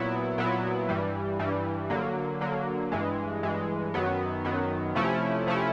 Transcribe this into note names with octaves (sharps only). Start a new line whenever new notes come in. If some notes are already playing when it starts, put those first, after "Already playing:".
Already playing: A#2 F#3 B3 E4
A#2 F#3 B3 E4
G2 E3 G3
G2 E3 G3
D3 F#3 A#3
D3 F#3 A#3
G2 E3 G#3
G2 E3 G#3
F#2 D#3 F#3 B3
F#2 D#3 F#3 B3
C3 F3 A3 C#4 E4
C3 F3 A3 C#4 E4